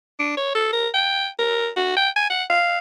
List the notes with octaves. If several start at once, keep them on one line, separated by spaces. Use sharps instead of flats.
D4
C#5
A4
A#4
G5
A#4
F#4
G5
G#5
F#5
F5